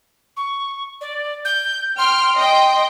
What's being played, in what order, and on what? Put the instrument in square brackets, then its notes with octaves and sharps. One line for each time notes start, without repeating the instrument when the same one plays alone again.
[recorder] C#6
D5
G6
[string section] G5 F6 [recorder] C6
[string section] D#5 G5